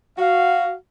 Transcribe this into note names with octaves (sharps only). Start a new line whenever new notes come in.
F#4 F5